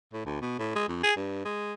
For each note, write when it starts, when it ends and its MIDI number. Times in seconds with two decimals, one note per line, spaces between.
0.13 0.25 45
0.25 0.38 38
0.41 0.54 47
0.59 0.73 45
0.75 0.88 56
0.88 1.02 41
1.03 1.13 68
1.16 1.40 43
1.45 1.73 56